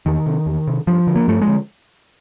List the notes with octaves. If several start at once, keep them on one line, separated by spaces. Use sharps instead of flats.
E2 D#3
C3
E2
C3
G2 F3
D3
A#3
G2 A3
G#3
D3